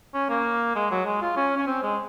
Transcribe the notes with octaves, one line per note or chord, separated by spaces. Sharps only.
C#4
A#3
G#3
F#3
G#3
F4
C#4
C#4
C4
G#3